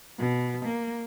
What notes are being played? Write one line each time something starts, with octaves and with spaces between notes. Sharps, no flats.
B2
A#3